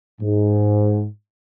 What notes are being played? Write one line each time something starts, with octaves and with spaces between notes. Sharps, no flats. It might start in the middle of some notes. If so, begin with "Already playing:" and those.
G#2